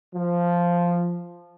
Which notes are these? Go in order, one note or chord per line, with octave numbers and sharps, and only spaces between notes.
F3